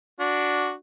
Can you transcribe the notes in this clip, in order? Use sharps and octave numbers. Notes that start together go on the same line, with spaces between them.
D4 F#4